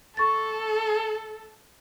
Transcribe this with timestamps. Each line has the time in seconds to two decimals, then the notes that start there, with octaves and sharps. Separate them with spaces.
0.17 A4 C#6 A6